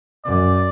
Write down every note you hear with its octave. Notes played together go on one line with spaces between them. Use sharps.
F#2 D5